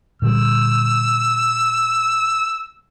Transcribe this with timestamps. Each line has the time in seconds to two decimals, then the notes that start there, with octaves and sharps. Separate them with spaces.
0.22 A#2 D3 G3 E6